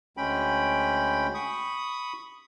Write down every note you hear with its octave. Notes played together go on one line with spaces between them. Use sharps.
D2 G#3 C#4 G5 B5
B5 C#6 D#6